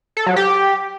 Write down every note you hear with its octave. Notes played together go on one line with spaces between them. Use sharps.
A4
F#3
G4